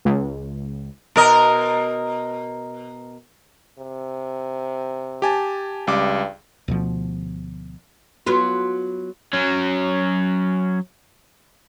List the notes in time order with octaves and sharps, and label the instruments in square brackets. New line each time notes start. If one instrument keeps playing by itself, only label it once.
[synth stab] C#2
[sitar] B2 A#4 D#5
[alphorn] C3
[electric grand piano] G4 G#5 A5
[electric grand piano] C#2 G3 D6 [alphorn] G2
[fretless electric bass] D2 B2 F3
[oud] F#3 B3 F4
[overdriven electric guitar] F#3 C#4